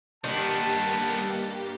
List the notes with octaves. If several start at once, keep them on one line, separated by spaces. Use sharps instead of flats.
G2 D3 D#3 A#3 B3 G4 A5